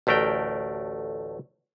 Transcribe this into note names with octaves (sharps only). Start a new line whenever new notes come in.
A1 D2 A3 A#4 G5